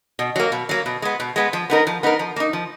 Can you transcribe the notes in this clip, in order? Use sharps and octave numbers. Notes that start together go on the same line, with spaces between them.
B2
F#3 A#3
B2
F#3 A#3
B2
G#3 B3
B2
G#3 B3
F3
B3 D#4 A#4
F3
B3 D#4 A#4
F3
A#3 D#4
F3